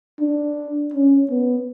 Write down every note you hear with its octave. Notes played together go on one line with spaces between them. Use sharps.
D4
C#4
B3